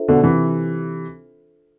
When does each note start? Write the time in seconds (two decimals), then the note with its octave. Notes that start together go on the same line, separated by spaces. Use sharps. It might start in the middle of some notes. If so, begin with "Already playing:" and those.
Already playing: D4 F4 A4 C5 E5
0.08 B2 D3
0.22 C3 E3